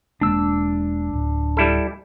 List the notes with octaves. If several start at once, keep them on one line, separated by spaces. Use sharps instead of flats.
E1 G#3 A#3 D4 E6
D1
G3 E4 A4